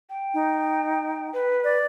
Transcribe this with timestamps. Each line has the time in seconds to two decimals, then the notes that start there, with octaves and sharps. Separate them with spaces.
0.10 G5
0.34 D#4
1.33 B4
1.64 D5